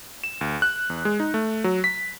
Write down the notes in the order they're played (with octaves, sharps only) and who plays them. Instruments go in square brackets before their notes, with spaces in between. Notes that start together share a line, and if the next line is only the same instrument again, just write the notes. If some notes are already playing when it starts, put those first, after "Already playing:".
[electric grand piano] E7
D2
F#6
E2
G#3
D#4
A3
F#3
B6